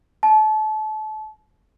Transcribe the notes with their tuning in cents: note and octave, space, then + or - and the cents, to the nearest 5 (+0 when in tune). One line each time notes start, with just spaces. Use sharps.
A5 -30